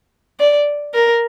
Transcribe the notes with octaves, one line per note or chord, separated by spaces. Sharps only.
D5
A#4